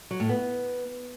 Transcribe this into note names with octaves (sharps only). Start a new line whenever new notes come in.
F#3
A2
B3